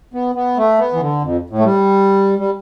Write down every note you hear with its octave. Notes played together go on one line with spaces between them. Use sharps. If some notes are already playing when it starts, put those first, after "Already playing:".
B3
B3
A3
B3
E3
D3
F2
A2
A3
G3
G3